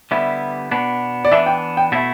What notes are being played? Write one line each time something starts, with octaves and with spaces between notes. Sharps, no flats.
D3 G3 B3 E4 E5
B2 B3 D4
D5
E3 B3 D4 E5
G5
G5
B2 A3 E4 E5